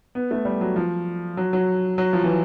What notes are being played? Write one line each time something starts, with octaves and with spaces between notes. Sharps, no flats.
B3
A3
G3
F#3
F3
F#3
F#3
F#3
F3
E3